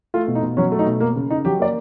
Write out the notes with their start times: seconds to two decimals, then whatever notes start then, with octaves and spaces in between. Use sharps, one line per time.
0.14 A3 F4
0.28 B2
0.35 D#4
0.43 B2
0.57 F#3 C#4
0.72 A3
0.79 D#4
0.87 B2
1.00 A#3
1.16 C#3
1.30 C#3 D#4
1.45 F#3 G4
1.59 A#3 D5